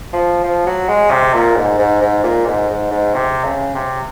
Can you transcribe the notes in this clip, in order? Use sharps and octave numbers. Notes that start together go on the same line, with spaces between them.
F3
F3
F#3
G#3
C3
A#2
G#2
G#2
G#2
A#2
G#2
G#2
G#2
C3
C#3
C3